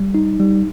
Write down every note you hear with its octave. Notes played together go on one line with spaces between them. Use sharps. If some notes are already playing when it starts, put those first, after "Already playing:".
Already playing: G3
D#4
G3